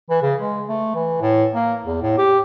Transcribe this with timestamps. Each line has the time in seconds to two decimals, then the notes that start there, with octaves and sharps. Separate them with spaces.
0.10 E3
0.22 C#3
0.41 G#3
0.69 A3
0.95 E3
1.21 A2
1.54 A#3
1.85 E2
2.02 A2
2.18 G4